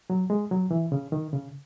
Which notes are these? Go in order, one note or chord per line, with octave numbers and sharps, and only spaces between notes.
F#3
G#3
F#3
E3
C#3
D#3
C#3